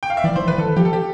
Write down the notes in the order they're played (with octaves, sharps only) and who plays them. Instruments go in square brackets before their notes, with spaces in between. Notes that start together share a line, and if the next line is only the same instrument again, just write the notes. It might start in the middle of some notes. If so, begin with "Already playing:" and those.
[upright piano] G5
F5
E5
[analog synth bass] E3 [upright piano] D5
[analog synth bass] E3 [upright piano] C5
[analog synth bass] E3 [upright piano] B4
[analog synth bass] E3 [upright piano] A4
[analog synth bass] F3 [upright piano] G4
[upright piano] A4
G4